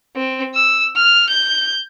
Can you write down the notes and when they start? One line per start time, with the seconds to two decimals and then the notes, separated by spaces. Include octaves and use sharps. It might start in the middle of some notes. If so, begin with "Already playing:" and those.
0.16 C4
0.54 E6
0.96 F6
1.29 G6